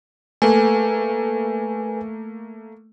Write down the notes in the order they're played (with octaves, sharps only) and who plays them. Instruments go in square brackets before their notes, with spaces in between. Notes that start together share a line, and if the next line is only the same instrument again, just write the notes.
[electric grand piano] A3 A#3 [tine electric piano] A4 B4 G#5